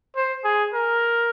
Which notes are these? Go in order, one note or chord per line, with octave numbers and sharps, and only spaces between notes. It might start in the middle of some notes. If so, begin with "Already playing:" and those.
C5
G#4
A#4